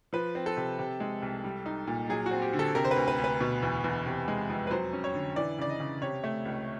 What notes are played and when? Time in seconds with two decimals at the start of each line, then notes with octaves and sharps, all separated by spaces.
0.13 F3 B4
0.35 C4
0.46 A4
0.57 C3
0.79 C3
1.00 G#3
1.22 C2
1.44 G3
1.66 D#4
1.87 A#2
2.09 F#3 G#4
2.26 F#4
2.31 C4
2.42 G4
2.53 D3
2.59 A4
2.75 C3 A#4
2.85 C5
2.91 B4
2.96 D2
3.08 B4
3.18 D2
3.24 B4
3.41 B2
3.63 E2
3.84 E2
4.06 C3
4.28 G#3
4.50 F2
4.67 B4
4.71 F#3 C5
4.93 C#4
5.04 C#5
5.14 D3
5.36 E3 D5
5.58 C#3 D5
5.69 D#5
5.80 C#3
6.02 C3 C#5
6.24 A3
6.45 C#2